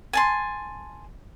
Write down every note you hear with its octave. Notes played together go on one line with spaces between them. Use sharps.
G#5 A5 C6